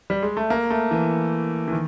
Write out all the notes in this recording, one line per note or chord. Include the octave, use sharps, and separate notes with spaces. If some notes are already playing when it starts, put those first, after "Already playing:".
G3
G#3
A3
A#3
A3
E3
E3
D#3